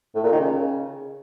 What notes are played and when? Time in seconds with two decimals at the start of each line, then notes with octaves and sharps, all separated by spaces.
0.15 A2
0.23 A#2
0.32 D#3
0.40 C#3